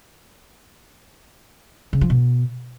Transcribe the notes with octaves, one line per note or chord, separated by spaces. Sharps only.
C#3
F3
B2